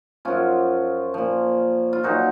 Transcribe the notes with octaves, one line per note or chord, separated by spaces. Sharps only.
F#2 F3 C#4 F4
A#2 F3
F4
A#2 F#3 D#4 F#4